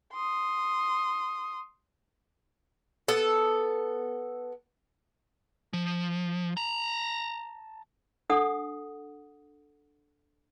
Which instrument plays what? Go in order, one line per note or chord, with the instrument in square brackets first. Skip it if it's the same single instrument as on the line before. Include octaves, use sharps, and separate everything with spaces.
[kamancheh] C6 D#6
[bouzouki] B3 A4
[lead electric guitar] F3
A5 A#5
[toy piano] D4 A4 F#5 D#6